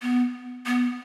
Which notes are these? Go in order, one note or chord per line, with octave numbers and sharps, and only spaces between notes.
B3
B3